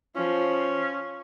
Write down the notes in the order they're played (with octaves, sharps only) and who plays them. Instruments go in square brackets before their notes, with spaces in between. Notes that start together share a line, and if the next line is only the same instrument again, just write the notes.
[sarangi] F3 [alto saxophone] C#4